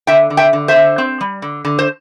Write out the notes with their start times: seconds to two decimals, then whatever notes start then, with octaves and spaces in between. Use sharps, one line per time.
0.07 D3 E5 G5
0.30 D3
0.37 E5 G5
0.53 D3
0.68 C5 E5
0.76 D3
0.98 C4
1.21 G3
1.42 D3
1.65 D3
1.79 C5